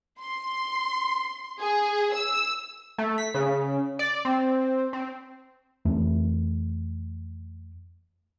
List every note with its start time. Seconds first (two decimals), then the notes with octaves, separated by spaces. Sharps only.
0.20 C6
1.59 G#4
2.14 E6
2.98 A3
3.18 B6
3.34 C#3
3.99 D5
4.25 C4
4.93 C4
5.85 F2 E3 A3